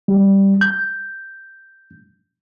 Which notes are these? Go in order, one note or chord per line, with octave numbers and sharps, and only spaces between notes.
G3
G6